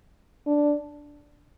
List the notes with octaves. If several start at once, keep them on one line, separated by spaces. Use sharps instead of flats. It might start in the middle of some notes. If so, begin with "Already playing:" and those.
D4